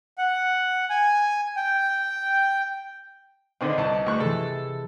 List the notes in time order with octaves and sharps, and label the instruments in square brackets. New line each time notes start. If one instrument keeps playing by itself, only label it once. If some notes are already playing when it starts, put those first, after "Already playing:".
[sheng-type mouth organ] F#5
G#5
G5
[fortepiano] D3 D#3 C4 [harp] B4 D#5 G5
[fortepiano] C2 A5
[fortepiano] D2 C#6 F#6 [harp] G#4
[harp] C3 E3 [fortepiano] A4